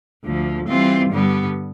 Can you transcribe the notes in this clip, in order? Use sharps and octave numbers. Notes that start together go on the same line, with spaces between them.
D2 D3 F3
E3 G3 C4 F4
G2 D3 G3 B3